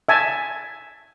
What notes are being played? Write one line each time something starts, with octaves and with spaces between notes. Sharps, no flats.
E5 G#5 A5